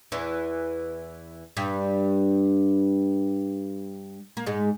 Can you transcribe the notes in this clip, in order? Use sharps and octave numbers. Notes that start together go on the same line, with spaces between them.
E2 E3
G2 G3
A#3
G#2 G#3